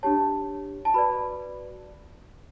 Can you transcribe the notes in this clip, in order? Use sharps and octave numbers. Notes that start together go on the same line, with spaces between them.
D4 G4 C#5 A5
A5
F#4 B4 D5 B5